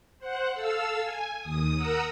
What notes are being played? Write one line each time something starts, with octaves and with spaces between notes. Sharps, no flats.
C5 F#5
A4 F5 E6
G#5
D#2 D#6
A#4 F#5 A#5 D#6 E6